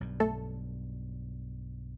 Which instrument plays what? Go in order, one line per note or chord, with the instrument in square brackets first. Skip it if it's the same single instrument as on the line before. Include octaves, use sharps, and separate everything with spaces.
[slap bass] B1 G2
[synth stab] A3 A4